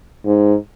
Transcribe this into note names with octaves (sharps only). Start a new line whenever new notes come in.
G#2